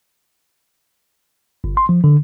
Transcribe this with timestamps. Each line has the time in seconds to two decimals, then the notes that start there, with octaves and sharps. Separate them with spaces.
1.64 G1
1.77 C6
1.89 F3
2.04 D3